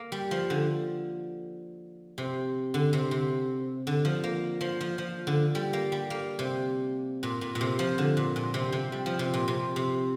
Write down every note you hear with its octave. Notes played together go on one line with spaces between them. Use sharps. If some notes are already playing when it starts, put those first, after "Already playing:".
Already playing: A#3
G3
F3
D3
C3
D3
C3
C3
D3
F3
A#3
F3
F3
F3
D3
G3
A#3
G3
A#3
C3
A#2
A#2
A#2
C3
F3
D3
A#2
A#2
C3
C3
G3
F3
C3
A#2
C3
C3